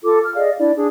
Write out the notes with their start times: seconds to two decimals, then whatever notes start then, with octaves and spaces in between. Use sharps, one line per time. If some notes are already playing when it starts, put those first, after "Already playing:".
0.04 F4 A4 D6
0.23 F6
0.35 G#4 D5 D#5 F5
0.58 D4 E4 D5
0.76 D4 G#4